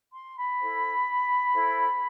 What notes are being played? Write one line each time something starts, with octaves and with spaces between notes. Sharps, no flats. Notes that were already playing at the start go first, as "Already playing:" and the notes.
C6
B5
E4 A4 C5
E4 A4 C5